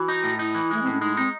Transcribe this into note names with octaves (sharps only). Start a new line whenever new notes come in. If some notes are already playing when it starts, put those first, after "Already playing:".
Already playing: E3 F#4
D#4
A2
D#4 E4
E3
G#3 A3
A2 C4
C#4
G#3 D#4
C4 D#4